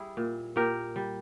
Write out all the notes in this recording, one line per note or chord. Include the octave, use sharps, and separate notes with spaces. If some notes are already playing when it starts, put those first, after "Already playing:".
Already playing: G3 E4 G#4
A#2
A#2 G4 A#4
G3